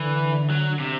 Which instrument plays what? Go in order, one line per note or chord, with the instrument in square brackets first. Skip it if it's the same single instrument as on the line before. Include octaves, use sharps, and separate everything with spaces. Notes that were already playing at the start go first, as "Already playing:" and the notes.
Already playing: [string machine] D3 [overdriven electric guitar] E3
[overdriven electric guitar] F#3
C3